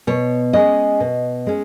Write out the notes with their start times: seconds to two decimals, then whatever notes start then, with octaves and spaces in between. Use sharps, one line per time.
0.07 B2 C#5
0.53 G#3 C#4 D#5
1.00 B2
1.47 G#3 C#4